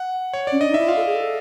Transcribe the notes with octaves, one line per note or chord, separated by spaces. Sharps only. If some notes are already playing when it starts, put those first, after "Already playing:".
Already playing: F#5
C#5
C#4 D5
D4 D#5
D#4
E5
E4
F4 F5
A4
G#4
A4